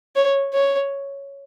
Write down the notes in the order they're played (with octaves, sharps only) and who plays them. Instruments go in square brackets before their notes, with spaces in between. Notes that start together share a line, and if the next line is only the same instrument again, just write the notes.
[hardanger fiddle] C#5
C#5